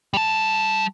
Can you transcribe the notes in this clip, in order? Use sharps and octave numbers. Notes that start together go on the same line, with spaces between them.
G3 A5